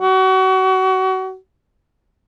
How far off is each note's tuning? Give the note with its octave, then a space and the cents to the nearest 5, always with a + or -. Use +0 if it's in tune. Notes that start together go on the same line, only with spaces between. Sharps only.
F#4 +30